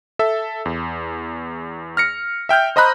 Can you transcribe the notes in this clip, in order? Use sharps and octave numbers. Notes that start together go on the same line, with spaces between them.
A4 E5 E6
E2
F6 A#6 C#7
E5 G5 F6 G6
C5 D#5 A#5 B5 F#6